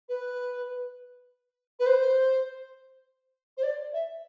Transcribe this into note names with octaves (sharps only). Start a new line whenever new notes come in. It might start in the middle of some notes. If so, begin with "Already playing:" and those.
B4
B4
C5
C5
D5
E5